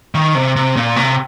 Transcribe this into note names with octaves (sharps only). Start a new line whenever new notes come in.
D#3
C3
C3
A#2
C3